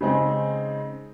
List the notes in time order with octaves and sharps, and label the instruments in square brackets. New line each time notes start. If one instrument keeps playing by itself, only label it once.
[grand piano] C#3 G#3 C4 D#4